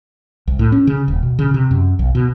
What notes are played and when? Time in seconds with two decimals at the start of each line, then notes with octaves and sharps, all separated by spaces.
0.47 C2
0.59 A2
0.72 C#4
0.87 C#3
1.08 D#1
1.23 B2
1.39 C#3
1.54 C3
1.71 F#2
1.99 B1
2.15 B2